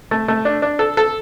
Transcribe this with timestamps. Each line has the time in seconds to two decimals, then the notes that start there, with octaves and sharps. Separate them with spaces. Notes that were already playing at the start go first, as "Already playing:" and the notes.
0.11 A3
0.28 A3
0.45 D4
0.62 D4
0.79 A4
0.97 A4